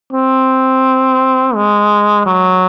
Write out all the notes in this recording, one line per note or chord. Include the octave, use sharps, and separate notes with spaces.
C4
G#3
F#3